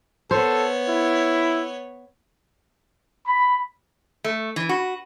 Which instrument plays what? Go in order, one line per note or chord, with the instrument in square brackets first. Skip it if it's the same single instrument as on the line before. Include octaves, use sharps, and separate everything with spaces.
[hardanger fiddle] B3 C#5 [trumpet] A4 [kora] C5
[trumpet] E4
[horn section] B5
[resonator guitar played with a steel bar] A3
E3
F#4